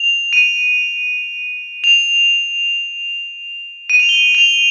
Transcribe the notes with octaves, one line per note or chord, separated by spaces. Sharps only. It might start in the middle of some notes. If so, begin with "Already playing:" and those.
Already playing: F7
D#7
F7
D#7
F7
G7
F7